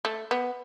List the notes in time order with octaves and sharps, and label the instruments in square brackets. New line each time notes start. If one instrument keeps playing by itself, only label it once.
[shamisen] A3
B3